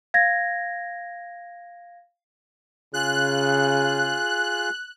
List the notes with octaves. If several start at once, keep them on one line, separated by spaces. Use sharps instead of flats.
F5 G#6 A#6
C#3 F4 G#4 F#6